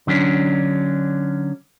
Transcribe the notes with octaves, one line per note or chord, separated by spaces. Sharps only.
D3 F#3 C#4 D4